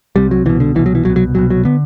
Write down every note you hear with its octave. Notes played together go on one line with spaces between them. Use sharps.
C2 C3 G3
F#3
C2 B2 E3
D3
C2 B2 E3
F#3
E3
C2 B2 F#3
F#3
C2 B2 F#3
F#3
D3 B3